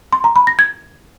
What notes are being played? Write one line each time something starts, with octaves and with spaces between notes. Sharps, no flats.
C6
A#5
B5
A#6
G#6